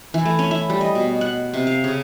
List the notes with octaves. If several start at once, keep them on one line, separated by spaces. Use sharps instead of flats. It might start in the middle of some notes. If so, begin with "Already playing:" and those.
E3
A3
C#4
E4
G3
D#5
B2
F#5
C3
F5
C#3